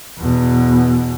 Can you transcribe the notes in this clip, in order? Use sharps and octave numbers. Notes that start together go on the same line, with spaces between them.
E2 B2